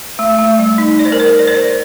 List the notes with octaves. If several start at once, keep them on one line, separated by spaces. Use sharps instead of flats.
A3
A3
G3
D#4
D5
C5
A#4
C5
D5
C5
D5